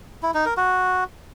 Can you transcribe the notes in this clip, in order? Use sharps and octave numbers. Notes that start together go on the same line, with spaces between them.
E4
D#4
A#4
F#4